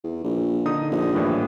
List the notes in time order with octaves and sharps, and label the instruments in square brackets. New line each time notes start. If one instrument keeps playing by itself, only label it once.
[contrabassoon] E2
A#1
[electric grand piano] D3 D#4 D#6
[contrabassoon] A#1
[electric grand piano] A2 E3 G3